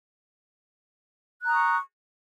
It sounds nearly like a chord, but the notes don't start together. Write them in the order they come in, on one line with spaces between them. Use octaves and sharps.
F#6 A#5 D#6 C#6